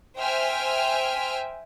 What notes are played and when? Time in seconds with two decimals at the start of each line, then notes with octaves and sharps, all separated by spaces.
0.17 C5 E5 G5 G#5 F6